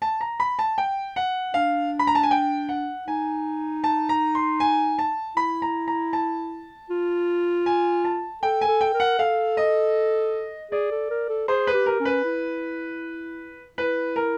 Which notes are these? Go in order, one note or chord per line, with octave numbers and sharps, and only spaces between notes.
A5
A#5
B5
A5
G5
F#5
D4 F5
B5
A#5
A5
G#5
G5
F#5
D#4 G#5
A5
A#5
C6
G#5
A5
E4 B5
A#5
A#5
A5
F4
G#5
A5
A4 G5
G#5
A4
G5
A#4
F#5
A4 F5
D#5
G#4 D5
A4
A#4
A4
G#4 C5
B4
G4
A#4
C#4
B4
E4
E4 B4
A#4